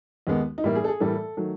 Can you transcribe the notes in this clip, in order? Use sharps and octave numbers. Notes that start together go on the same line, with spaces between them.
D#2 D#3 G#3 B3
D#4
A2 E3 G3 A#3 E4
G#4
A4
G#4
A2 E3 G3 A#3 A4
D#3 F#3 A3